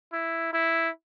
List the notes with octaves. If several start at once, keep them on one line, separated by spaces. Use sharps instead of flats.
E4
E4